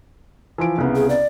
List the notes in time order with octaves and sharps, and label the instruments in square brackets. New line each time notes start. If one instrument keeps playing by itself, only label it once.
[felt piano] E3 F3 D7
C2 C#3 B3
[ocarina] G#4
D5